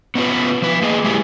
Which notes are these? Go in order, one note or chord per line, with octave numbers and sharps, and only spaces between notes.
B3 C#4 D4 E4 F4 B4
F3 B4
A#3 G#4 D#5
G#3 A#3 E4 G4 G#4